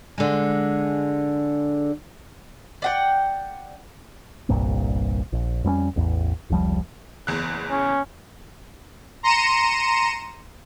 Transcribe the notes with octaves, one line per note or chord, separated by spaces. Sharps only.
D3 G#3
D5 F#5 G5
G1 C2 G2 A#2
A#1
F2 G3 A3 C#4
A1 E2
F1 C#2 F3 G3
F#1 E2 F#6
C#4
A#5 C6 A#6 C#7 D#7 E7